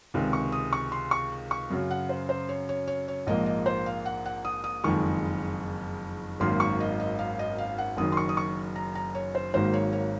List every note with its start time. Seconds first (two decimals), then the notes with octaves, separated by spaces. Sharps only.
0.14 C#2 C3 D#3 G#3
0.33 C#6
0.52 D#6
0.73 C#6
0.92 C6
1.11 C#6
1.51 C#6
1.70 F#2 C#3 F#3
1.91 F#5
2.09 C5
2.29 C5
2.49 C#5
2.69 C#5
2.88 C#5
3.08 C#5
3.27 A#1 G#2 F3 A#3 D#5
3.46 D#5
3.66 C5
3.86 F5
4.06 F#5
4.26 F#5
4.45 D#6
4.64 D#6
4.84 F#1 F2 D#3 G#3 C#6
6.40 G#1 F#2 D#3 A#3 C6
6.60 C#6
6.80 D#5
7.00 D#5
7.19 F5
7.39 D#5
7.58 F5
7.78 F#5
7.97 F#1 F#2 D#3 D#6
8.12 C6
8.17 C#6
8.29 D#6
8.37 C#6
8.76 A#5
8.95 A#5
9.15 C#5
9.35 C5
9.54 G#1 G#2 D#3 F#3 A#3 C5
9.73 C#5
9.93 C#5